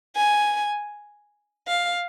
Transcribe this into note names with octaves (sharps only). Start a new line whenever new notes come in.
G#5
F5